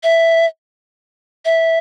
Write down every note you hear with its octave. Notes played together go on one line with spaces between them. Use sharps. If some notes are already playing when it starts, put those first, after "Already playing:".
E5
E5